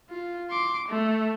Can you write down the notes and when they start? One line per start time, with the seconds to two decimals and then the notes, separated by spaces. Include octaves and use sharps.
0.10 F4
0.50 C6 D6
0.88 A3